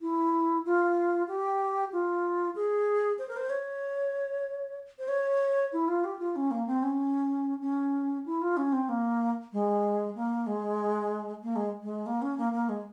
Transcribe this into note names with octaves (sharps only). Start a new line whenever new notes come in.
E4
F4
G4
F4
G#4
C5
A#4
C5
C#5
C5
C#5
E4
F4
G4
F4
C#4
A#3
C4
C#4
C#4
E4
F4
C#4
C4
A#3
G#3
A#3
G#3
A#3
G#3
G#3
A#3
C#4
A#3
A#3
G#3